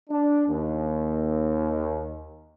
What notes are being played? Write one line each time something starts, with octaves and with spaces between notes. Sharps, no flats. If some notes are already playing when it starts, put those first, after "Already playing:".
D4
D#2